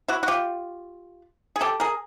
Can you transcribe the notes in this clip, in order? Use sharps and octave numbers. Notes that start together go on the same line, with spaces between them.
E4 F#4
F#4
F4 G4
G#4
G4 A4
G#4 A#4